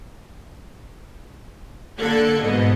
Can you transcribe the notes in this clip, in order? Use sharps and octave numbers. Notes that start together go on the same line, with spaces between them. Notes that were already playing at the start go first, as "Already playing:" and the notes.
D3 A#3 A4 F#6 G#6
G#2 B2 B3 D#5